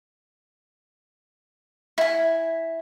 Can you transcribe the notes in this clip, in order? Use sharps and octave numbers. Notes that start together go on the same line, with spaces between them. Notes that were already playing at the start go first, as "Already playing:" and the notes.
E4 G#5